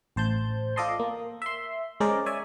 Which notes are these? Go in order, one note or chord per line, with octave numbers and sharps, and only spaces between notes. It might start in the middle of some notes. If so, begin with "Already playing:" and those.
A1 C5 A5 G6
F4 A4 D5 D#5 A5 C6
A#3
E5 C6
G#3 C#4 G#4 A#4 C5 D5
C#5 D5 E5 G#5